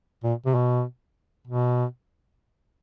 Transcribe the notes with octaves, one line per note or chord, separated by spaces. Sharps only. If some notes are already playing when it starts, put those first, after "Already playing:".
A#2
C3
B2
B2